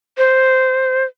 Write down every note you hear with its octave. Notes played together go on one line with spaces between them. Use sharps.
C5